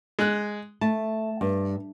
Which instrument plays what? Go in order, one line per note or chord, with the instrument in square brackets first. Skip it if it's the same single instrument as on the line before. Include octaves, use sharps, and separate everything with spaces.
[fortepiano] G#3 F#6
[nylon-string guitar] A3 [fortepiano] A5
[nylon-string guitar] G2